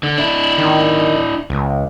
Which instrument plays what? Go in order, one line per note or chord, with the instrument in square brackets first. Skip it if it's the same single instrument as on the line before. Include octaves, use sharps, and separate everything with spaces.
[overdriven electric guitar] D3
D4 E4
[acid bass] D#3
C#2